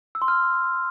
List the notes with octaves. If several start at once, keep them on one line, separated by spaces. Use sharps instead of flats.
E6
C6
F6